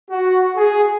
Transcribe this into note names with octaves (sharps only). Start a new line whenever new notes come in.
F#4
G#4